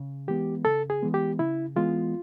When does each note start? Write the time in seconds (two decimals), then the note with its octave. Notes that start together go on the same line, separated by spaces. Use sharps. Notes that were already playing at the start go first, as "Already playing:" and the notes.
Already playing: C#3
0.28 E3 G#3 B3 G4
0.65 C#3 A4
0.90 G#4
1.02 E3 G#3 B3
1.14 G4
1.39 C#3 E4
1.76 E3 G#3 B3 F4